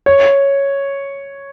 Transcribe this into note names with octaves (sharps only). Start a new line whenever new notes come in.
C#5